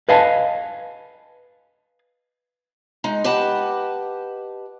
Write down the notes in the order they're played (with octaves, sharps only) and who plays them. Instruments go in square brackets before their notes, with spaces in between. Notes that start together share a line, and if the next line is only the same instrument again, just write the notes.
[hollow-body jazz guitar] B4 D#5 F5 G#5 A5
[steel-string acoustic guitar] G#3 D#4
G4 B4 D#5 F#5 A5